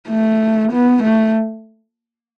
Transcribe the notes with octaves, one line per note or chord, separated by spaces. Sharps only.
A3
B3
A3